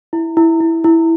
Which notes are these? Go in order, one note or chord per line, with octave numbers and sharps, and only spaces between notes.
E4
E4
E4
E4